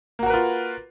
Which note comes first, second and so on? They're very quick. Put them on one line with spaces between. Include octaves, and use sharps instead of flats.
A#3 F#4 A#4 B4 F4